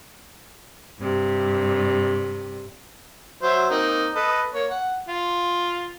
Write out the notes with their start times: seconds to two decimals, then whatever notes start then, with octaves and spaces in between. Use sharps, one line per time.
0.99 G2 C3
3.42 F#3 C5 E5
3.70 A#3 C4 D#4
4.15 A4 B4 D#5
4.53 A#3 C#5
4.71 F#5
5.07 F4